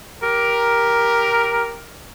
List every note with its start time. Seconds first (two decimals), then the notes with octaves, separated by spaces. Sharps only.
0.23 G4 A#4